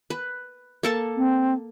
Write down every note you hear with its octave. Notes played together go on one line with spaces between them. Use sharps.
B4
A#3 A4 A5
C4